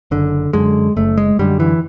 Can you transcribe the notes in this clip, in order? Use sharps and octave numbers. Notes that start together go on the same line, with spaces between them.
F#1 D3
F#2 D3 G#3
F#1 A3
G#3
F#2 D3 G3
E3